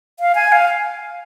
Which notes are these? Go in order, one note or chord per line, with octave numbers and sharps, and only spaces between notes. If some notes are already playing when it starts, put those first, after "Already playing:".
F5
G#5
F5